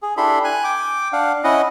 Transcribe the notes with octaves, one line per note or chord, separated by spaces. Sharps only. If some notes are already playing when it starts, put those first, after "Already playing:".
G#4
D4 E4 G4 A4 B5 C6
G#5 F#6
G5 D6
D4 F5 F#5
C#4 E4 D#5 F#5